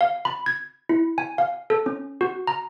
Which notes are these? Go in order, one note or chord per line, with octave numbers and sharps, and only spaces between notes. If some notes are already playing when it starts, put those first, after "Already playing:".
F5
B5
G#6
E4
G#5
F5
A4
C#4
F#4
A#5